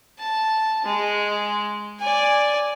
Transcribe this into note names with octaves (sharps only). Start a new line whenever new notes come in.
A5
G#3
D5 G#5